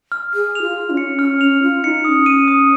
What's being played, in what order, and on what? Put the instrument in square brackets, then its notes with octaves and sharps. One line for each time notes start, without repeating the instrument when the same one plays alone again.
[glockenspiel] F6
[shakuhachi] G#4 [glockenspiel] F6
[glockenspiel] F7
[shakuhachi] F4
[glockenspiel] F6
[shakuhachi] C#4
[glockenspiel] C#7
[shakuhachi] C#4 [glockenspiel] F6
[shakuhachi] C#4 [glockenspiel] F7
[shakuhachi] F4 [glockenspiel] F6
[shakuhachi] D#4 [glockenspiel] C#7
[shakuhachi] D#4 [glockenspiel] D#6
[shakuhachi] C#4
[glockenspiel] D#7
D#6